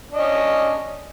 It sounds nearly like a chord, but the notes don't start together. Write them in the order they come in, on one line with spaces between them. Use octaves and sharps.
D4 D#5 C#4